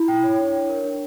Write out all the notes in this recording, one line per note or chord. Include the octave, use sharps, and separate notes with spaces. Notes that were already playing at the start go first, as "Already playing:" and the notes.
Already playing: E4
G5
C#5
D4
D4
A#4
D4